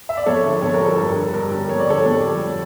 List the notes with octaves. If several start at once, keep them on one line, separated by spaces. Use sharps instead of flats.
E5
D5
F2 A4 C#5
D3
F2 A4 C#5
A#4
G3
A4
G2
D3
G2 A#4
G3
F2 C#5
D5
D3 A4 C#5
F2
G3